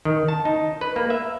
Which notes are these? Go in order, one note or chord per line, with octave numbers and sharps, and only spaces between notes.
D#3
A5
D#4
B4
A#3
E5